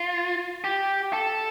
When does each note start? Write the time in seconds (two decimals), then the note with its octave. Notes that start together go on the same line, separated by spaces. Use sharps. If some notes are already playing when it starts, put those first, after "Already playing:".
Already playing: F4
0.64 G4
1.13 A4